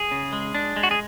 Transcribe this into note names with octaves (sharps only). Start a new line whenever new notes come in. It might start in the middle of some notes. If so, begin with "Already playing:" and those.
Already playing: G#4
C#3
G#3
D4
G#3
F#4
G#4